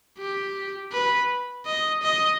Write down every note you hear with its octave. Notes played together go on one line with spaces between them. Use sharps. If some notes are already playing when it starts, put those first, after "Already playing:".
G4
B4
D#5
D#5